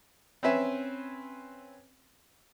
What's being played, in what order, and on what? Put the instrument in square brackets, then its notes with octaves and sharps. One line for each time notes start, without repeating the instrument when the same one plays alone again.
[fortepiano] C4 C#4 B4 E5 G#5